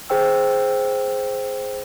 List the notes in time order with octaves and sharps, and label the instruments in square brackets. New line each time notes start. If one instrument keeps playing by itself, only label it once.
[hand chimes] G#4 C5 G5 E6